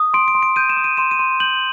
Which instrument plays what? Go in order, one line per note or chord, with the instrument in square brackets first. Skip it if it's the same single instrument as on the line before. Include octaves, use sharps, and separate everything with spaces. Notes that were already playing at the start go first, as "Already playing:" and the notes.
Already playing: [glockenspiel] D#6
C6 D7
D7
C6
D7
G6 D#7
E7
D#6
D#7
C6 E7
D#7
C6
G6 F#7